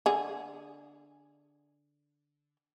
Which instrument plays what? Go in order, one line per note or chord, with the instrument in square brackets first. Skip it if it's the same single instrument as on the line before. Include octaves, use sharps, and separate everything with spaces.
[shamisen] D3 G#4